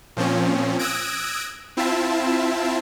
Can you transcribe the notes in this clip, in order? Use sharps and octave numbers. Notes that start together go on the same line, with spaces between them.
A#2 F3 C4 C#4
D#6 E6 F#6 G#6 A#6 D7
C4 E4 F4 E5 A5